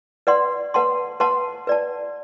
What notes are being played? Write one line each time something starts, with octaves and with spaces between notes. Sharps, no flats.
B4 D5 F#5 C6
B4 F#5 A5 C6
B4 F#5 A5 C6
B4 D5 A5